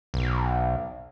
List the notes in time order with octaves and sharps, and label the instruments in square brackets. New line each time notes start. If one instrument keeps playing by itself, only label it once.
[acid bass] B1